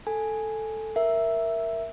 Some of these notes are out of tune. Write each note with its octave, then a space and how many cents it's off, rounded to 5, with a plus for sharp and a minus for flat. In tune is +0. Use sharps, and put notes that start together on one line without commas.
A4 +0 G#5 +0
A#4 +0 E5 +0